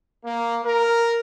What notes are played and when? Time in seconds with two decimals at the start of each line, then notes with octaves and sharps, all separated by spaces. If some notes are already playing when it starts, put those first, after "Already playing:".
0.24 A#3
0.64 A#4